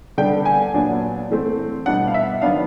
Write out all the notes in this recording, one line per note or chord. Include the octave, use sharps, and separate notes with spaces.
D3 G3 B3 D4 G5
G#5
A#2 F#3 B3 D4
E3 A3 C4
B2 G3 B3 D4 F#5
F5
E5
D#3 F#3 B3 D4 F5